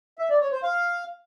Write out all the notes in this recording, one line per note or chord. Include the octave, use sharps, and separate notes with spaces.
E5
D5
C#5
C5
F5